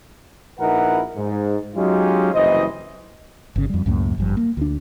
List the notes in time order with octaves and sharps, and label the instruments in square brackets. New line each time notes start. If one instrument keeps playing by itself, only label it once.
[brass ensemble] A#1 D#4 E4 A#4 B4 F#5
G#2
F#3 G#3 C#4 D#4 F4 G4
F#1 C2 E3 C5 D#5
[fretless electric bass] G1 C#3
F2 G3
C#2 F#2 A2 A#3
G#1 G2 F3
A#3
D2 D4